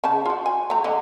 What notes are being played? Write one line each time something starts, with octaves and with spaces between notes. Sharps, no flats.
C#3 A5
F4 F#4
G#5
A3 A#5
D3 A#3 D#5